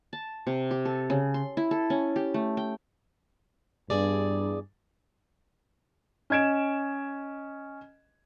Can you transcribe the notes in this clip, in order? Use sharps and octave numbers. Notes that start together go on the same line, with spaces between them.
A5
C3
G4
A4
C#3
C6
E4
A4
C#4
G4
A3
G5
E2 G2 G#4 D5
C#4 D#5 G#6 D7 E7